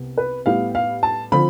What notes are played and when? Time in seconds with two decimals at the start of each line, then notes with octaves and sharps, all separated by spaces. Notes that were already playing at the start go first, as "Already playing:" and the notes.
Already playing: C2 C3 B3
0.18 B4
0.46 A2 G3 B3 E4 F5
0.75 F5
1.03 A5
1.32 D3 F3 C4 F4 B5